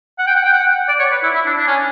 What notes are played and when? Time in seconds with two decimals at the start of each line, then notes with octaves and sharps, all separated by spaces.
0.19 F#5
0.27 G5
0.36 F#5
0.44 G5
0.53 F#5
0.88 D5
0.99 C#5
1.11 B4
1.23 E4
1.35 E4
1.46 D4
1.58 D4
1.67 C#4